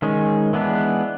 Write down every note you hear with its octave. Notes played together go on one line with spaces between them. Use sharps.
D#3 G#3 C#4
E3 G#3 B3 D4